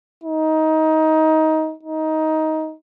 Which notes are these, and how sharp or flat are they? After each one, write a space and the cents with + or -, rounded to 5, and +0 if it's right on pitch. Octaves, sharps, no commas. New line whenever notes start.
D#4 +20
D#4 +15